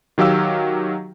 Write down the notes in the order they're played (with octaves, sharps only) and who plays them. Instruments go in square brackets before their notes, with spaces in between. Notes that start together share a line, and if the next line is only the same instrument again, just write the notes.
[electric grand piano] D#3 F#3 G4 F5 E6